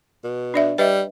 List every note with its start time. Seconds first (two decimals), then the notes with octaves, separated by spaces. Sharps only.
0.24 B2
0.54 D4 D5 E5
0.78 G3 B4 D#5 E5